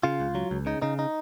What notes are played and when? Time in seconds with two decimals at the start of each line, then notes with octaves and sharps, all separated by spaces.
0.03 C#3 F4
0.20 C#2
0.35 F#3
0.51 C#2
0.66 C#3 D#4
0.82 C#3 D#4
0.99 D#4